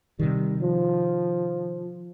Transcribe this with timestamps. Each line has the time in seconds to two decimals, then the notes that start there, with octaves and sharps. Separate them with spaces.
0.20 C3 D#3 G3
0.62 F3